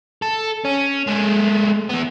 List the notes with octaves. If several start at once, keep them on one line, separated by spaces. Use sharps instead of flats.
A4
C#4
G#3 A3
E3 B3